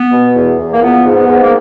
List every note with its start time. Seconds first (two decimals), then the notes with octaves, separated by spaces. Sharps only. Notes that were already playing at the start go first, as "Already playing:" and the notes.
Already playing: B3
0.12 B2
0.35 E2
0.58 E2
0.72 A#3
0.81 F3 B3
1.04 G#2
1.16 B3
1.27 G#2
1.42 A#3